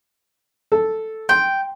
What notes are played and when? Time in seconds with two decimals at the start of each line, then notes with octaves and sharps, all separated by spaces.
0.72 A4
1.29 G5 C6